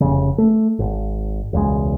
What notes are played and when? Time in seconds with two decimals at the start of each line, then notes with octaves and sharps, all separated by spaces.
0.01 F1 C#3
0.38 A3
0.79 G#1
1.53 E1 C#2 G#3